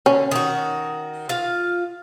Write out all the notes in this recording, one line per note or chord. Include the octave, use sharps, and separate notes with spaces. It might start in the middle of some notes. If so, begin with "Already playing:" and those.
D3 C#4
D#3 F#4
F4 F5